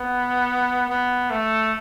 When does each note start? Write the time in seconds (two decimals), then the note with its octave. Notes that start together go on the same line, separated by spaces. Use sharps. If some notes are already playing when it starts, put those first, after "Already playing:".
Already playing: B3
0.89 B3
1.30 A3